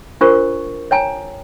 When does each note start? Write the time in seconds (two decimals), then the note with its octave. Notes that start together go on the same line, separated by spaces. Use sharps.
0.21 D4 F4 A#4 C5 C#6
0.91 C#5 G5 G#5 A#5